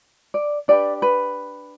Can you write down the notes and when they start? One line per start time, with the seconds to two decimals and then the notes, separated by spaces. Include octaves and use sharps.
0.34 D5
0.68 D4 G4 B4 D5
1.02 B4